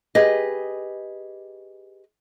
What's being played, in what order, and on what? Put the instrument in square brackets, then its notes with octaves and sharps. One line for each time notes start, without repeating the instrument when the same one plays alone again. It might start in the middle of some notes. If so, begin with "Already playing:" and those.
[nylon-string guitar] G4 G#4 B4 D#5